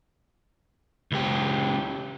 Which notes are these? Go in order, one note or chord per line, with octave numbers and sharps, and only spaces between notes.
C#2 G4